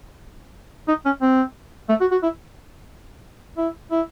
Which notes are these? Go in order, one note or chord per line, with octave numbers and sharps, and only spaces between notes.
D#4
C#4
C4
A3
F#4
F#4
E4
E4
E4